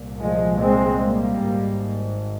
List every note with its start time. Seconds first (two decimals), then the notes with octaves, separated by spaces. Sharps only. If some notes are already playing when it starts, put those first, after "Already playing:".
Already playing: C2 A#2
0.21 F3 G#3
0.61 G#3 C4
1.01 G3 A#3
1.41 G#1 G#2